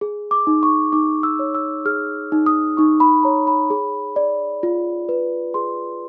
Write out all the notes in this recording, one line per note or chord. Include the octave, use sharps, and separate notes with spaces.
G#4
D6
D#4
C#6
D#4 D6
E6
C#5
E6
G#4 F6
D#4
D#6
D#4 C#6
B5
C#5 A#5
B5
G#4
D5
F4
B4
G#4 C6